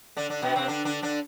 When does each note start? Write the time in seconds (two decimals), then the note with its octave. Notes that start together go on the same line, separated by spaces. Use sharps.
0.17 D3 D4
0.30 D3 D4
0.42 B2 B3
0.56 C3 C4
0.68 D3 D4
0.85 D3 D4
1.02 D3 D4